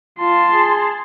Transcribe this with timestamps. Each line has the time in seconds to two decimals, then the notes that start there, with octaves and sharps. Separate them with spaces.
0.18 F4 A5 C6
0.52 G#4